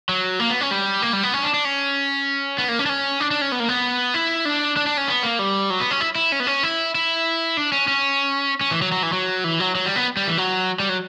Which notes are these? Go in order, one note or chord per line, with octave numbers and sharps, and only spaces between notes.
F#3
A#3
B3
C#4
G3
A#3
G3
B3
C#4
D4
D4
C#4
B3
A#3
C#4
D4
C#4
D4
D4
C#4
B3
A#3
B3
E4
D4
D4
D4
C#4
B3
A#3
G3
F#3
B3
C#4
E4
E4
C#4
B3
C#4
E4
E4
D4
C#4
C#4
C#4
E3
F#3
F#3
E3
F#3
E3
F#3
F#3
G3
B3
G3
E3
F#3
G3
F#3